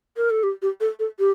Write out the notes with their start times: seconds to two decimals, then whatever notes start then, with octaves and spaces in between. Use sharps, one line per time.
0.17 A#4
0.30 A4
0.43 G4
0.62 G4
0.81 A4
0.99 A4
1.19 G4